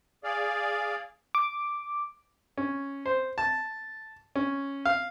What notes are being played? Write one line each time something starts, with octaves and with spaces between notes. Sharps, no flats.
G#4 D5 F5
D6
C#4
C5
A5
C#4
F5